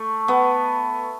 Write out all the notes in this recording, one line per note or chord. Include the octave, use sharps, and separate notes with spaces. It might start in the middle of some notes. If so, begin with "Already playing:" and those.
Already playing: A3
B3